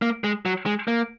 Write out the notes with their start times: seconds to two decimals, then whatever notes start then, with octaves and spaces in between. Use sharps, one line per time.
0.02 A#3
0.24 G#3
0.46 F#3
0.66 G#3
0.88 A#3